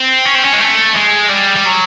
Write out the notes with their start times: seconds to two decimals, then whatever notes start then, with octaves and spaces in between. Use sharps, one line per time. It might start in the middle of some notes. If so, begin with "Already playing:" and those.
Already playing: C4
0.26 C#4
0.35 C4
0.45 C#4
0.54 G#3
0.61 A3
0.96 G#3
1.30 G3
1.56 G3
1.66 F#3